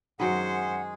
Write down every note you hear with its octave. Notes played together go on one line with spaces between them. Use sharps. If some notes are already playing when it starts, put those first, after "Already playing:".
F#2 D#3 F#3 G#3 G#4 C5 F#5